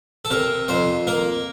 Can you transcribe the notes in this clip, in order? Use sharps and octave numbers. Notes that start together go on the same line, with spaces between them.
A4
C3 A#4
F2 C5
A#3 A#4